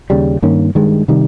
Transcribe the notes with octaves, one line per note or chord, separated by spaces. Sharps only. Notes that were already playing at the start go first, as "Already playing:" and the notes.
D#2 C#3 G3
G2 D#3 A#3 C#4
G2 D#3 G#3
C3 D#3 G3